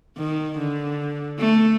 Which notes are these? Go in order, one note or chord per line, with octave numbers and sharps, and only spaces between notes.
D#3
D3
A3